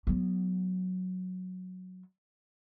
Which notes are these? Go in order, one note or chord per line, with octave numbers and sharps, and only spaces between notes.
F#3 B3